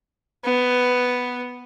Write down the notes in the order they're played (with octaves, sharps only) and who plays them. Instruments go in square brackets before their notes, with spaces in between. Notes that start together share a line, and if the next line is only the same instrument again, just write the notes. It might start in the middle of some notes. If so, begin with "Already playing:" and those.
[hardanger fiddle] B3